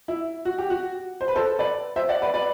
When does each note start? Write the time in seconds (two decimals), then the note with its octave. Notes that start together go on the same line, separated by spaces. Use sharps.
0.08 E4
0.45 F#4
0.58 G4
0.70 F#4
1.21 C5
1.28 B4
1.36 A4 C5
1.59 B4 D5
1.96 C5 E5
2.09 D5 F#5
2.22 B4 D5
2.34 B4 D5